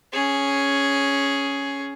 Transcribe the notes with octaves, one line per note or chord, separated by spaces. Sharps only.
C#4 G#4